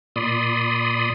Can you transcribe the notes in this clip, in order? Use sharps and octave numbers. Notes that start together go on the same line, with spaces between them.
A#2 D5 B5 C6 D#6